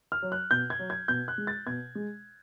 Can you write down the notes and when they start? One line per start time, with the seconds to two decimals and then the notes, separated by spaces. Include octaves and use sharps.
0.12 F6
0.23 F#3
0.32 F#6
0.51 B2 G6
0.70 G#6
0.79 F#3
0.90 G#6
1.08 B2 G6
1.28 F#6
1.38 G#3
1.47 A6
1.67 B2 G#6
1.95 G#3